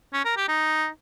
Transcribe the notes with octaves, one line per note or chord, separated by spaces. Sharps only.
C#4
A#4
G4
D#4